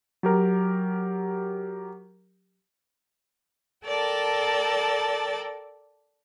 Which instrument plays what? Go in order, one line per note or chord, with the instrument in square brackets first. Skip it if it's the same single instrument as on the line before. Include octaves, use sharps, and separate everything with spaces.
[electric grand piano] F#3 G4 A#4
[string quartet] A4 A#4 D5 G5 A5